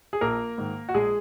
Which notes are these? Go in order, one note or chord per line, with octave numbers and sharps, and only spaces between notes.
G#4
A#1 A#3 A#4
G#2 D#3
F#4
A#1 G#3 G#4